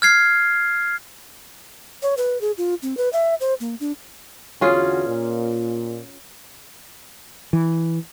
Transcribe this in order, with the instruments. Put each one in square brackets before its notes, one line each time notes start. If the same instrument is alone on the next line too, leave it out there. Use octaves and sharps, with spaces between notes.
[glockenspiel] F6 G#6 C7
[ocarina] C#5
B4
G#4
F4
C4
B4
E5
C5
A#3
D4
[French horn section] E2 D3 F#4 [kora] C#4 F4 G#4
[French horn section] A#2
[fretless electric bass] E3